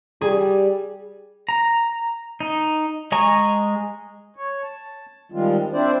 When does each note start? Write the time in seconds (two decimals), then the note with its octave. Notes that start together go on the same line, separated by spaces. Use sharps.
0.21 G3 G#4
1.49 A#5
2.40 D#4
3.12 G#3 D#5 G#5 A#5 C#6
4.36 C#5
4.63 A5
5.32 D#3 F3 G3 G#3 C4 F4
5.73 C4 D4 E4 C5 D5